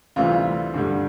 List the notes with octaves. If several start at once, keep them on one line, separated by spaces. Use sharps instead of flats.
D2 C3 E3 G3 F4
G2 D3 G3